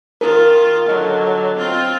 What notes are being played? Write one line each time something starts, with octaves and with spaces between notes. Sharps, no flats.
D#3 F4 A#4
D3 F#3 D#5
C4 F4